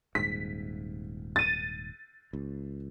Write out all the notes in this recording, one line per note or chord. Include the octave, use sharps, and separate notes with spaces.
D#1 G#2 B6
A6 D#7
C#2